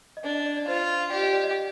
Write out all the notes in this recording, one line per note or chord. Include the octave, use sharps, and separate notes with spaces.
D#5
D4 D5
D#5
D5
D5
F4 C5
G4 D5
D#5
D5
D#5